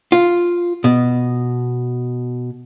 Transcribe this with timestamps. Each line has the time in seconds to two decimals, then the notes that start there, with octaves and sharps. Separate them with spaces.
0.12 F4
0.84 B2